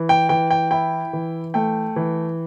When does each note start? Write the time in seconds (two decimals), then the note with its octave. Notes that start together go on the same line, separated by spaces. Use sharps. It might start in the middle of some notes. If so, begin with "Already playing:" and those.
Already playing: E3
0.09 G5
0.29 E3 G5
0.51 G5
0.71 E4 G5
1.13 E3
1.54 A3 G5
1.96 E3